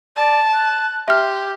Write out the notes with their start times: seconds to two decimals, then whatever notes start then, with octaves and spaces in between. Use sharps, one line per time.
0.17 D5 A5
0.53 F#6
1.08 G4 E5 C6 F6